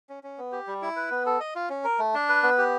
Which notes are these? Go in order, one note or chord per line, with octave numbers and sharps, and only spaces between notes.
C#4
C#4
B3
G4
G3
E4
B4
B3
A4
D#5
F4
C#4
A#4
A3
D4
B4
B3
G4